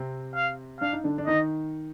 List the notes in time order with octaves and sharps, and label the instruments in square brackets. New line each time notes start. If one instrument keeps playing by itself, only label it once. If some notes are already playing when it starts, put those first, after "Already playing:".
Already playing: [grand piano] C3 C4
[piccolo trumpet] F5
[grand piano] D4 [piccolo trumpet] F5
[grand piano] D#4
D3 D4
D4
[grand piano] D#3 D#4 [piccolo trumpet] D#5